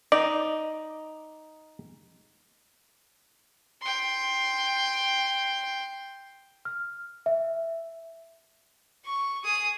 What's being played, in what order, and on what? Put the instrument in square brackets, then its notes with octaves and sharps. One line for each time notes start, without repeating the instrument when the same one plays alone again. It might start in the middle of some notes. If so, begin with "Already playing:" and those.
[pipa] D#4 [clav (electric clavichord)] D5
[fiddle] G5 C6
[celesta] F6
E5
[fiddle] C#6
G#4 D#6